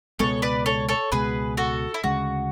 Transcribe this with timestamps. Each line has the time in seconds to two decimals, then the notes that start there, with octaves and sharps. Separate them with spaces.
0.19 C#2 B2 G#3 B3 A4 C#5
0.42 B4 D5
0.66 A4 C#5
0.89 A4 C#5
1.12 C#2 B2 G#3 G#4 B4
1.57 F#4 A4
1.94 E4
2.04 D2 C#3 G#3 F#4